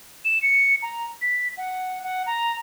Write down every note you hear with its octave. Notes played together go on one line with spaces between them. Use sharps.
E7
C#7
A#5
B6
F#5
F#5
A#5